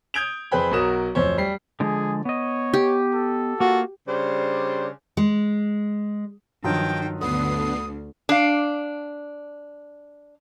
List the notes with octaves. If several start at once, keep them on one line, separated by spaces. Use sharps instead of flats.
D#6 G6 G#6 D7 F7
F2 G#4 B4 C5 G5 B5
B1 F#3 F#4 A#4 D#6 E7
D1 F2 C5 C#5
G3 C7
D3 F3 G#3 G#4
B3 C#5 D#5
G4
A4
A#3 F4 F#4
C#3 G3 D4 C5
G#3
G2 D#3 F3 F#3 G5
D2 D3 B3 D#6 C7
D4 F5